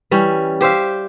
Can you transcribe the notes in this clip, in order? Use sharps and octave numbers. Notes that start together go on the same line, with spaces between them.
E3 G3 C#4
G4 C5 E5 F5